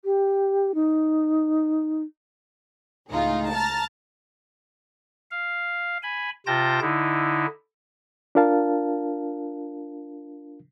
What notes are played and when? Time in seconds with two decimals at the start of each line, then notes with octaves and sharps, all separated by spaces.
0.05 G4
0.75 D#4
3.09 C#2 A2 D#4 F4 G#4
3.52 A5 A#5 F6 A6
5.31 F5
6.03 G#5 B5
6.47 C3 F4 G5 A5 G6 A#6
6.81 D3 D#4 E4
8.35 D4 F4 A#4 F5 A5